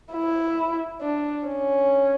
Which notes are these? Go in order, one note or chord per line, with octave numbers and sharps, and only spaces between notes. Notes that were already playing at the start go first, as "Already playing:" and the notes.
E4
D4
C#4